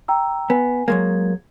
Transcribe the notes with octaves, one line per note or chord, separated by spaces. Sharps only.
G5 A#5 E6
B3 G#5
F#3 G#3 A#3 G#6